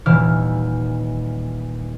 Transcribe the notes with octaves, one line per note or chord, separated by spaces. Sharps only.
D#1 E3 F6